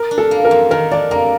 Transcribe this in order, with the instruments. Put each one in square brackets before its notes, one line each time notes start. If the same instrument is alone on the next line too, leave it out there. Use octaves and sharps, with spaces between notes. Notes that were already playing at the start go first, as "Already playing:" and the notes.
Already playing: [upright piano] A#4
[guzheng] D4
[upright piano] A4
[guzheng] A#3
[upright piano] A#4
[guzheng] F2
[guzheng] D#3 [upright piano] A#4
[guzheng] D4 [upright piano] D5
[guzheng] A#3 [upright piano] A#5